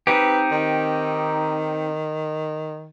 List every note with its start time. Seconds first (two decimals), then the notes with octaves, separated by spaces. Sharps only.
0.07 C4 D#4 G4 B4
0.51 D#3